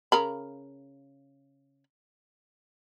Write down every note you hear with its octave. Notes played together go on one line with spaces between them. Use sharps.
C#3 A#4 B5